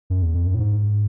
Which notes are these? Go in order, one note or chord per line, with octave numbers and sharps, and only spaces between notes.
F#2
E2
F2
F#2
A2
G#2